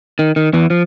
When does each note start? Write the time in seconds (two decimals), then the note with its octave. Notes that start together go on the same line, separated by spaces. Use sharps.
0.19 D#3
0.36 D#3
0.53 E2 E3
0.70 F3